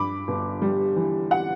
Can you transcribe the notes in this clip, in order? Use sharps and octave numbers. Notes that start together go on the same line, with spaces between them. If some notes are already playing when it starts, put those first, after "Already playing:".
Already playing: G2 B5 D6
G1
G3
E3
F#5